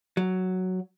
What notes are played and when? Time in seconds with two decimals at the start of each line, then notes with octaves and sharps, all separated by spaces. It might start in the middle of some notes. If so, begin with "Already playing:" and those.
0.17 F#3